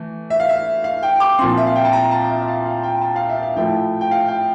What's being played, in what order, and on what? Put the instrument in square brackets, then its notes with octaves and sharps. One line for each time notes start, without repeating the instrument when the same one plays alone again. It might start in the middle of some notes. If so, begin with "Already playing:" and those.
Already playing: [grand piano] E3 A3
E5
F5
E5
F5
G5
D6
A#2 F3 C4 C6
E5
F5
G5
A5
A#5
A5
E5
E5
F5
F5
G5
A5
F5
E5
F5
A2 F3 A3 E4 G5
G5
F5
G5